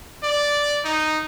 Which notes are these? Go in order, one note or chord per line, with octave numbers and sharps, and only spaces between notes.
D5
D#4